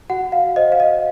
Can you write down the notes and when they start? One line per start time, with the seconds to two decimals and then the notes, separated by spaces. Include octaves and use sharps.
0.10 F#4 F#5
0.32 F5
0.56 C5 D#5
0.72 F5
0.80 D#5